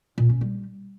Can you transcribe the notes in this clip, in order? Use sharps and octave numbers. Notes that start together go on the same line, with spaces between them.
A#2
C#4
G3